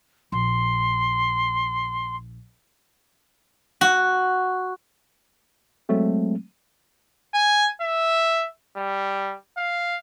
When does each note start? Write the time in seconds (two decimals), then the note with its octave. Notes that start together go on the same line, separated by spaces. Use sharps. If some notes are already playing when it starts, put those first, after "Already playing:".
0.32 A#1 C6
3.81 F#4
5.89 F#3 G#3 A3 C4
7.34 G#5
7.81 E5
8.77 G3
9.57 F5